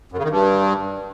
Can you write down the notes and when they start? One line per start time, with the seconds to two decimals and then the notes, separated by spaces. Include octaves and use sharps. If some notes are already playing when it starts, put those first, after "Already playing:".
0.12 F#2
0.18 C#3
0.24 D#3
0.30 G2